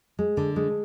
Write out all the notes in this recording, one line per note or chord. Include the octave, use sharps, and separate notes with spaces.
G#3
D3
G#3